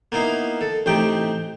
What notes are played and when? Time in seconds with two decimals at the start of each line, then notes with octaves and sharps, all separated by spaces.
0.12 A#3 B3 D#4 E4 F5
0.61 A4
0.86 A1 C3 D#4 G4 G5